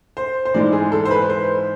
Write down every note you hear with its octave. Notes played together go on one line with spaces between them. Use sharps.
C5
C5
G#2 E3 G#3 D5
G#4
A4
C5
B4
C5